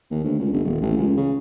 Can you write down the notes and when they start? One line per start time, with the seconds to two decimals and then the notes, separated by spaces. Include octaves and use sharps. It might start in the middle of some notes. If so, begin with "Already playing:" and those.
0.11 D#2
0.24 D2
0.39 C#2
0.52 G1
0.64 D#1
0.82 A1
0.97 C#2
1.17 C#3